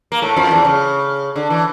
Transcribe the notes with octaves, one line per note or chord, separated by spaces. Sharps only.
A#3
A2 A3
F2 F3
E2 E3
C#3
D3
E3